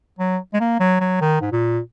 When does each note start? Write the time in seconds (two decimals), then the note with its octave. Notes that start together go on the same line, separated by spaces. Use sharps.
0.19 F#3
0.54 G#3
0.60 A#3
0.80 F#3
1.00 F#3
1.21 D#3
1.41 G#2
1.51 A#2